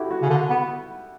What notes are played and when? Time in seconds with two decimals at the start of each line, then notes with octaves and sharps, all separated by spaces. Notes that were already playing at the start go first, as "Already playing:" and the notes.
Already playing: E4 F#4 G4 A4
0.11 F#4
0.22 C#3
0.30 D3
0.50 B3